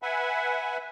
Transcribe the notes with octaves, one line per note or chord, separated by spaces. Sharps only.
B4 E5 F#5 G#5